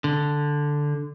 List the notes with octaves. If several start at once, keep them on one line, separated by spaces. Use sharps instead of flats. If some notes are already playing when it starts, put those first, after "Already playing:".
D3